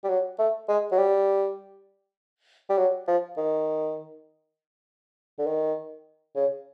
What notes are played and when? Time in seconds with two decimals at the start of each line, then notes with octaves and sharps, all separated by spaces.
0.04 G3
0.09 F#3
0.39 A3
0.68 G#3
0.92 F#3
0.98 G3
2.69 G3
2.78 F#3
3.07 F3
3.37 D#3
5.38 D3
5.46 D#3
6.36 C#3